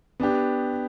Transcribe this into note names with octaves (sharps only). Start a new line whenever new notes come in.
B3 D4 G4